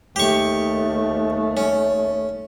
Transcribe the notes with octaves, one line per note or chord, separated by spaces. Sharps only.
D#2 A3 G4 C#6
C#4